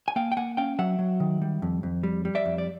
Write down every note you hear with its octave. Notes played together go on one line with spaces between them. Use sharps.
G#5
A#3 F5 G5
G5
A#3 F#5 G#5
C#4 F5 G5
F#3 E5 F#5
F#3
D#3
G3
F2
F2
G3
G3
D5 E5
F2
D5